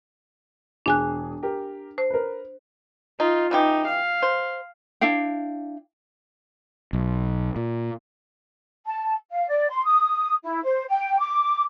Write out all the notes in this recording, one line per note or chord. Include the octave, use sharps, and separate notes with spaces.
E1 D4 G#4 G#5 F#6
G4 A#4
C5
A#4 B4
D#4 F4
C#3 E3 D#4 G4
F5
C5
D4 E4 F5 G5
B1
A#2
A5
F5
D5
C6
D#6
E4
C5
G5
D6